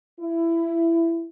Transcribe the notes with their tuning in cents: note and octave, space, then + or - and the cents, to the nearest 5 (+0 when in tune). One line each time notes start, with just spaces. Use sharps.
E4 +15